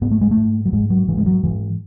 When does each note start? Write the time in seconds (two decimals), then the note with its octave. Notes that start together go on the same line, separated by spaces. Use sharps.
0.01 G#2 B3
0.11 A3
0.21 G#3
0.31 A3
0.37 G#2
0.65 F#3
0.73 G#2 G#3
0.90 F#3
1.08 G#2 E3
1.18 G#3
1.26 F#3
1.44 G#2 E3